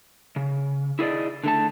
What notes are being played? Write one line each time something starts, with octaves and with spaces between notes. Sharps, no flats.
C#3
E4 G#4 A4 D5 D#5
D3 A3 A5